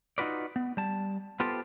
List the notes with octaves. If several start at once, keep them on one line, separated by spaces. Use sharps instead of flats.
D#4 F4 F#4 B4 D5
B3
G3 A5
B3 F4 G4 A4 C5